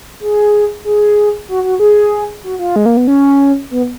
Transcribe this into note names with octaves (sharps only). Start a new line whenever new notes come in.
G#4
G#4
F#4
F#4
G#4
F#4
F4
G#3
A#3
B3
C#4
B3